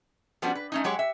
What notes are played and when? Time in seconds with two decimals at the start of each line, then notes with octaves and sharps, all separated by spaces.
0.42 F3 G3 B3 C#4 D4 F#4
0.55 B4
0.72 A3 C#4 D#4
0.84 F#3 G#3 G4 C#5
0.99 E5